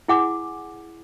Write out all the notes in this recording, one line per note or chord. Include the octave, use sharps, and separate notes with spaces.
E4 G#4 F#5 G#5 D6